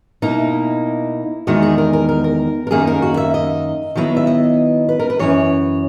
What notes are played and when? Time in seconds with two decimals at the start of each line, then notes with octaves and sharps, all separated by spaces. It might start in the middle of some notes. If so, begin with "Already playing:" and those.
0.22 B2 A#3 D#4 E4
1.47 E2 D#3 G#3 D#4 F#4
1.63 G#4
1.78 A#4
1.93 A#4
2.09 A#4
2.24 A#4
2.67 A#4
2.71 F#2 D#3 A#3 D#4 G#4
2.87 A#4
3.02 F#4
3.17 E5
3.34 D#5
3.95 D#3 F#3 B3 E4
4.17 E5
4.27 D#5
4.89 B4
4.99 A#4
5.10 B4
5.19 F#2 C#3 E3 C#5